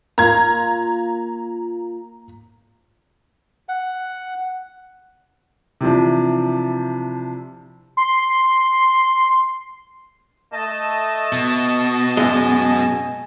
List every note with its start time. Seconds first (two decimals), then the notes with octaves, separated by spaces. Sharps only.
0.18 A#3 F4 A#5 G#6
3.69 F#5
5.81 C3 E3 F3 D4
7.97 C6
10.53 A3 D#5 A5
11.33 B2
12.17 F#2 G#3 G#5